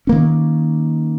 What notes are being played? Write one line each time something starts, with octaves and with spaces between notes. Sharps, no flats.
D#3 A#3 C#4